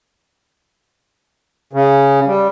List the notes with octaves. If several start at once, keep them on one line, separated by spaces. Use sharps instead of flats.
C#3
G3